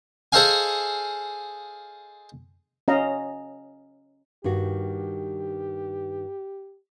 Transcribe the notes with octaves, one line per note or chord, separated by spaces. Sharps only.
G#4 A4 C5 D#5 F5 G#5
C#4 D#5 F5 A#5
G2 D#3 F#4 G4